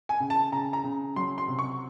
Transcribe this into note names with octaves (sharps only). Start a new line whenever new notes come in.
G#5
C#3
A5
C#3 A#5
A#5
C#3
F#3 C6
C6
C3
C#6